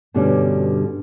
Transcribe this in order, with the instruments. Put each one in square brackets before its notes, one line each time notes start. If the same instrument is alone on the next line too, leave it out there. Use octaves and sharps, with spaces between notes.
[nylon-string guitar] G2 B2 D3 G3 C#4 D4